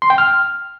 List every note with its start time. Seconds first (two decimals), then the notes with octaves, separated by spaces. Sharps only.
0.02 C6
0.10 G5
0.18 F6